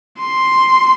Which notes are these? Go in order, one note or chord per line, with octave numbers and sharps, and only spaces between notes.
C6